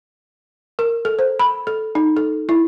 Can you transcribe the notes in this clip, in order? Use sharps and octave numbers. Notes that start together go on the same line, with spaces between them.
A#4
A4
C5
B5
A4
D#4
A4
E4